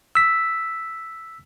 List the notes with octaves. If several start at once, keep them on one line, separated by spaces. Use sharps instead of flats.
E6 B6